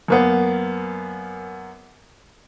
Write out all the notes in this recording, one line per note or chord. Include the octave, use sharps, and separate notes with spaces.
F#2 A#3 B3